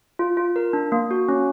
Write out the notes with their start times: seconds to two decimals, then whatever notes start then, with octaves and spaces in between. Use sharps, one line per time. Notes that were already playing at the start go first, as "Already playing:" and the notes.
0.19 F4
0.37 F4
0.56 A#4
0.73 D4
0.92 A#3
1.11 F#4
1.29 C#4